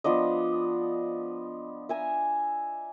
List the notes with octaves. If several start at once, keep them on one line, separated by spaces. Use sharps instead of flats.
F3 B3 D4 D#5
E5 G#5 A#5